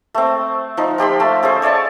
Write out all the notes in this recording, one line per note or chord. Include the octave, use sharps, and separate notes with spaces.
A3 C4
F3 D#4
F3 G4 B5 C6
A3 A5
C#4 G#4 A4 C5
C#5 D5 E5 A5